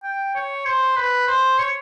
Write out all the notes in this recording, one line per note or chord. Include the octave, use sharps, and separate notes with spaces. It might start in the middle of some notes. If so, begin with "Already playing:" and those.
G5
C#5
C5
B4
C5
C#5